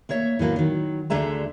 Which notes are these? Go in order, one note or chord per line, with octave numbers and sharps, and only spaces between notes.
A3 A#3 C#5 E5
A2 F#3 A#3 B3
D#3 F#3
D2 D3 A3 G#4 E5 A#5